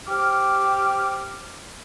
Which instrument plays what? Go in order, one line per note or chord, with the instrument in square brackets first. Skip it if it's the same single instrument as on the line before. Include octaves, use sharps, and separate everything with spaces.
[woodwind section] G4 C5 D6 F6